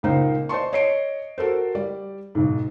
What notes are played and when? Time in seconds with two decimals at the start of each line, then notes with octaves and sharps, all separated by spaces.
0.03 C#2 A#2 A#3 D#4 C5
0.49 C5 D5 D#5 A5 C6 C#6
0.73 C#5 D#5 C7 D7
1.38 F#4 A4 A#4 C5
1.75 G3 D5
2.35 B1 G#2